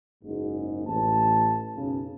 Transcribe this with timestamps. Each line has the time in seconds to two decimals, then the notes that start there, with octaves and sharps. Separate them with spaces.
0.24 F#1 G#2
0.87 A1 A5
1.76 B1 F#2 C#3